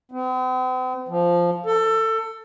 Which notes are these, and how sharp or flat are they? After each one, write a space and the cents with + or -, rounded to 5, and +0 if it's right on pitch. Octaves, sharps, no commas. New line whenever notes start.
C4 -45
F3 -5
A4 +20